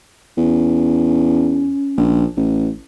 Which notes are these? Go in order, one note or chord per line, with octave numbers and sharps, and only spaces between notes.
E2 C#4
A#1
A1